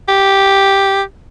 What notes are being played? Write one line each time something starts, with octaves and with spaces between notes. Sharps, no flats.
G4